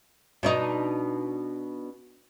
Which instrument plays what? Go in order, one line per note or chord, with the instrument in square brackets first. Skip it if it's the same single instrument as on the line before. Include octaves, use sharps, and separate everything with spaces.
[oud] B2 D4 D#4